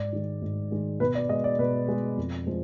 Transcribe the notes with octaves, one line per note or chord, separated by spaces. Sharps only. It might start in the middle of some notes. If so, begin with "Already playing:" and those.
Already playing: G#2 D5
D#3 G#3
G#2
D#3 G#3
B2 B4
D5
G#3 D#5
D5
B2 B4
G#3
F2
F3 G#3